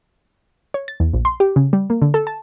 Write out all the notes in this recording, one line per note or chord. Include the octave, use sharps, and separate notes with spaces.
C#5
A6
E2
A#1
C6
G4
C#3
G3
A#3
D3
A4
A5